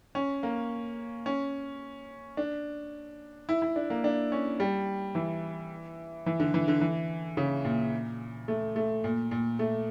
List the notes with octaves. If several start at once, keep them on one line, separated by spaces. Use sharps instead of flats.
C#4
A#3
C#4
D4
E4
E4
D4
A#3
D4
C#4
G3
E3
E3
D3
E3
D3
E3
C#3
A#2
A3
A3
A#2
A#2
A3